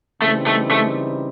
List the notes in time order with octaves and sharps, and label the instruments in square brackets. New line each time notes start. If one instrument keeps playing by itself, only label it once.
[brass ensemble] C#3 E3 G3 C4 D#4 [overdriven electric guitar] A3
[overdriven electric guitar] A3
A3